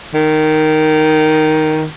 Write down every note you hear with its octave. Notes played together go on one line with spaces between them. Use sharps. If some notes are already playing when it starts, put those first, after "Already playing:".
D#3